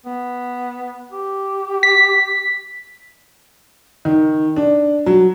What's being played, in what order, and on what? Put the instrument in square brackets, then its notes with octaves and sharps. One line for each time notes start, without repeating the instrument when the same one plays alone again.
[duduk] B3
G4
[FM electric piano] B6
[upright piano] D#3
D4
F#3